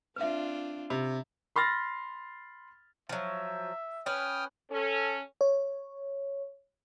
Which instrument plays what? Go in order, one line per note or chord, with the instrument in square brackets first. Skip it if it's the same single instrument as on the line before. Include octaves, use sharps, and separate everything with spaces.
[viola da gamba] C4 D4 F4 [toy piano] B4 E5
[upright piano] C3 [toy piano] B5
[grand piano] B5 C6 F6 A6 A#6
[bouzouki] F3 F#3 [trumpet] E5
[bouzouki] C#4 B4 [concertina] G5 D#6 F6
[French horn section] C#4 A4
[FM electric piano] C#5